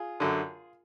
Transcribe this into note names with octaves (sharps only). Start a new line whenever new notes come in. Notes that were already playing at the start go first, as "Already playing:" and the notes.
Already playing: F4 G#4
F#2 D3